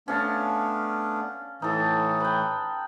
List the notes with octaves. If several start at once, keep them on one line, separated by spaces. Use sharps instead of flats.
A3 B3 C#4 D4 F5 A5
A2 E3 D#4 A4
B4 G5